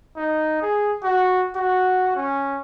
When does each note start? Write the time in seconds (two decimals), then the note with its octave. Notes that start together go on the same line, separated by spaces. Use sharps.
0.17 D#4
0.62 G#4
1.04 F#4
1.55 F#4
2.16 C#4